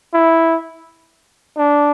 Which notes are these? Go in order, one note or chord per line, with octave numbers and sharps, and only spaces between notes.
E4
D4